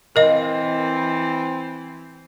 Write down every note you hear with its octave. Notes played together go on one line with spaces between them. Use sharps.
E3 C4 A#4 D#5 F5